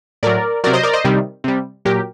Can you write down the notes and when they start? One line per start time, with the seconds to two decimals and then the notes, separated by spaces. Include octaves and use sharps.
0.23 A2 F#3 A#4 D5
0.64 C3 F#3 A#4 D5
0.73 C5 D#5
0.83 A#4 D5
0.93 C5 D#5
1.05 C3 D#3 G3
1.44 C3 G3
1.85 A#2 F#3 G4 A#4